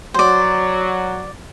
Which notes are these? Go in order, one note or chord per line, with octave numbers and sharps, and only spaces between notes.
F#3 C5 D5